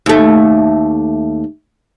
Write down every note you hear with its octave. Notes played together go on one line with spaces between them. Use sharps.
D#2 A3